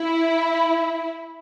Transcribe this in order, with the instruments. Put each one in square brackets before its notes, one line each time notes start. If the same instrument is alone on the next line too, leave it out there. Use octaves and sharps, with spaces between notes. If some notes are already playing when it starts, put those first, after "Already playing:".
Already playing: [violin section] E4